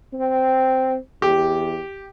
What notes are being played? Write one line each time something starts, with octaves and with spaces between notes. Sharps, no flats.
C4
E2 G4